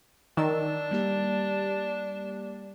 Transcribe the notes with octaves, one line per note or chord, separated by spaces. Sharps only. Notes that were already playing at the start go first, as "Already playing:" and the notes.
D#3 D4 E6 A6
G3 A#3 G4